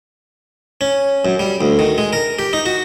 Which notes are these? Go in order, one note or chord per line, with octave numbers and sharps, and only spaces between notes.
C#4
F#2
G3
D2
D#3
G#3
A#4
G4
D#4
F#4